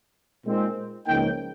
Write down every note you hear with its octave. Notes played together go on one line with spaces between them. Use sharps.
A#2 G#3 C4 D#4
C#2 C#3 F3 A#3 D#4 G5